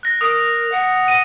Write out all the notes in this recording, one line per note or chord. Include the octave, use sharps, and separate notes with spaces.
F#6 A#6
A#4 D#6
F#5
A#6 D#7